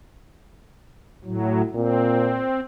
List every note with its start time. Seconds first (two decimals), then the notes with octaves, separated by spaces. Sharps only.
1.24 A2 F#3
1.75 A#2 C4